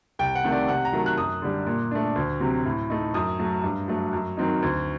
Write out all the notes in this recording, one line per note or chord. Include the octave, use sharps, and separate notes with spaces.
C2 G5
F#5
C3 D#3 A3
D5
C3 F#5
A#5
D#3 F#3 A3
F#6
F#2 D#6
D3 G3
A#2
A3 D4
D2
C3 F#3 C4
A2
A3 D#4
F#2 D#6
F#3 A3
G2
F#3 A3
F#2
D#3 F#3 C4 D#4
D2